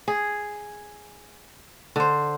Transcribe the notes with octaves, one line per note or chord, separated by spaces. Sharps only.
G#4
D3 C5